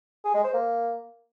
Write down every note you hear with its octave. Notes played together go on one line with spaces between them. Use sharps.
G#4
G#3
C5
A#3